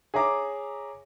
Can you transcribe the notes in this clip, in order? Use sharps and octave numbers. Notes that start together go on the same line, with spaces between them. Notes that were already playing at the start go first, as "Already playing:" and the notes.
G#4 C#5 E5 A#5 D6